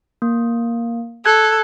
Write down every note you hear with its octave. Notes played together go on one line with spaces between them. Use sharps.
A#3
A4 F#6 G#6